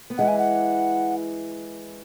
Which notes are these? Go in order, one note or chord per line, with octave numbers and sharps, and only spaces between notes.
B3
E3 G#3 F#5
G#5
F#5